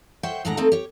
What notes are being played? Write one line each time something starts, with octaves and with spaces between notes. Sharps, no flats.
C5 C#5 E5 F#5 G5
D#2 A2 G#3 D4 F#5 A#5
A3 A#3 C4 D#4 A4
G4 C#5